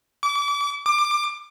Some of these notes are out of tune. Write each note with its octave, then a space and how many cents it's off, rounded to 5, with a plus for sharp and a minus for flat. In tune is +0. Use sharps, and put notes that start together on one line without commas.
D6 -35
D6 +20